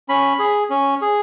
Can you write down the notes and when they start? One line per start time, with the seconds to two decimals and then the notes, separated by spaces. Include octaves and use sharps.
0.09 C#4 B5
0.39 G#4
0.70 C#4
1.02 G#4